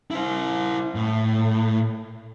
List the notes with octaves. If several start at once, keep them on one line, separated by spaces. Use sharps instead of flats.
E4 C5
A2